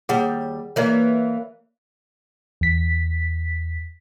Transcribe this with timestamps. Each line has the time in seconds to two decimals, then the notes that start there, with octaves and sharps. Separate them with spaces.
0.09 D#2 G3 G#4 F#5
0.76 E3 A#3 C#5 D5
2.61 E2 B6